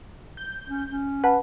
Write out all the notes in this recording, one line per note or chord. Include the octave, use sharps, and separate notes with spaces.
G6
C#4
C#4
B4 F#5 A5